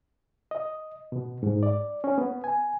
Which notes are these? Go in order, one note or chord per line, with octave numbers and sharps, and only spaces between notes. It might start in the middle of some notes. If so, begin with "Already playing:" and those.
D#5
B2
G#2
D5
C#4
B3
G#5